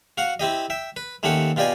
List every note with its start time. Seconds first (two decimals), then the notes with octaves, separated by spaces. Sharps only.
0.18 F#4 F5 F#5
0.40 C4 E4 G4 D#5
0.70 E5 G5
0.96 B4
1.23 D#2 A3 C4 C#4 G4 F#5
1.56 B2 F4 G4 D5 D#5 G#5